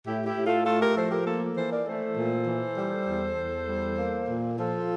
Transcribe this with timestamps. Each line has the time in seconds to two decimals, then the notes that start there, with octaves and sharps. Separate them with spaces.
0.06 A2 E4 G4
0.25 E4 G4
0.36 A2
0.46 F4 A4
0.65 A3 F4 A4
0.81 G4 A#4
0.96 F3 A4 C5
1.11 G4 A#4
1.26 A#3 F4 A4
1.56 E3 A4 C5
1.71 A#4 D5
1.87 A3 A4 C5
2.17 A#2
2.47 E3
2.77 G3
3.08 E2
3.37 E2
3.68 G3
3.98 A#3
4.28 A#2
4.58 F3 F4 A4